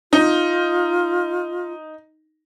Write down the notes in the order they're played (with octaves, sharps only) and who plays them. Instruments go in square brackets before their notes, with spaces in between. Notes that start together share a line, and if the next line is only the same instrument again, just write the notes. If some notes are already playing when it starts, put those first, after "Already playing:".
[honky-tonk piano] D#4 [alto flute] F4